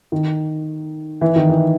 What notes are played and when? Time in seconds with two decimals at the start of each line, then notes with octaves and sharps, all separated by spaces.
0.12 D#3
1.21 E3
1.36 D#3
1.49 E3